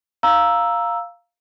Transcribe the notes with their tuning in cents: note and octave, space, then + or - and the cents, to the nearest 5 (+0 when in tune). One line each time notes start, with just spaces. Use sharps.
F5 +0 A#5 +0 E6 +0